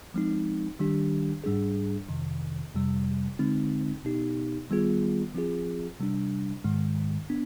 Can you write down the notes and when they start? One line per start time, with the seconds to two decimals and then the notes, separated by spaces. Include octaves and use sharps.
0.14 F3 G#3 C4 D#4
0.79 D#3 G3 D4 G4
1.44 G#2 G3 D4 G#4
2.09 F2 C3 D#3
2.74 F2 C3 G3
3.39 D3 G#3 C4 D#4
4.04 B2 B3 D#4 G4
4.70 D#3 G3 B3 F4 G#4
5.34 F3 C4 F4 G#4
6.00 C3 G3 D4
6.64 G#2 D#3 G#3
7.30 B3 D4